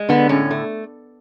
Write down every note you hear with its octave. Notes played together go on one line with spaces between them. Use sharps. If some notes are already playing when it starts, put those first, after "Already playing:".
Already playing: G#3
D3 B3
A2 C#4
A3